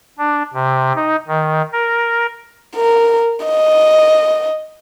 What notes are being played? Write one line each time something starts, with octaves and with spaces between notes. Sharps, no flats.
D4
C3
D#4
D#3
A#4
A#4
D#5